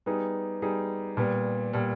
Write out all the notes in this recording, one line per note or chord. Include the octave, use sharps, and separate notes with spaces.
G3 B3 D#4 G#4
G3 B3 D#4 G#4
A#2 G3 B3
A#2 G3 B3